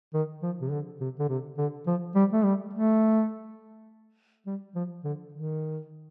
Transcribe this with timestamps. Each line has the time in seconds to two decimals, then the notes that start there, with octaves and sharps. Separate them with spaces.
0.14 D#3
0.42 F3
0.61 C3
0.71 D3
1.00 C3
1.19 D3
1.29 C3
1.58 D3
1.86 F3
2.15 G3
2.33 A3
2.44 G3
2.73 A3
4.46 G3
4.75 F3
5.04 D3
5.33 D#3